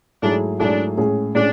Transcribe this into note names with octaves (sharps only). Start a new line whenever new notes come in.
G#2 F#3 A3 D4 E4 G#4
G#2 F#3 A3 D4 E4 G#4
A2 G#3 C#4 G#4
A2 G#3 C#4 D4 G#4